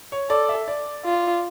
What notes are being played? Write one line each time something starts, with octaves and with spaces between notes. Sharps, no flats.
C#5
A4 D5
E5
D5
F4